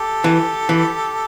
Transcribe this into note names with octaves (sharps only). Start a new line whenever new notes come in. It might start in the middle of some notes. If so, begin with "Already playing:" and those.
Already playing: G4 A4
E3
E3